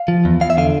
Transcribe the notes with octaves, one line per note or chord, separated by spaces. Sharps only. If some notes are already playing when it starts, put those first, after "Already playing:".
Already playing: F5
F3
E2
E2 F5
E5
D3 F5